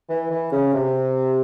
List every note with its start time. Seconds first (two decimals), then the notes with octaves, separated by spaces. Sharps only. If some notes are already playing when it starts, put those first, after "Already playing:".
0.09 E3
0.31 E3
0.52 C#3
0.74 C3